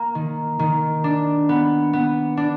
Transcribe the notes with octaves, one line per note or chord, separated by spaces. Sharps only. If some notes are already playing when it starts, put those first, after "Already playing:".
Already playing: A#3
D#3
D#3
D4
B3
B3
D4